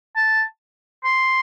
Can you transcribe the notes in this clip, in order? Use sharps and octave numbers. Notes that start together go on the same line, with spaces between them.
A5
C6